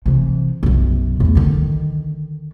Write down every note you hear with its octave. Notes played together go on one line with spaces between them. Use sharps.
C3 E3
B1 F#2
E2 A3
D3 D#3